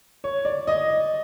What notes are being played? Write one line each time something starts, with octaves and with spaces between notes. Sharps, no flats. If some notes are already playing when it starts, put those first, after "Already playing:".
C#5
D5
D#5